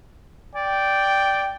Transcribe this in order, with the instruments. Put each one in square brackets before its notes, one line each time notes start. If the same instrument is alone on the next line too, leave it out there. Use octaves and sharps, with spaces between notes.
[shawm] D5 [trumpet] G5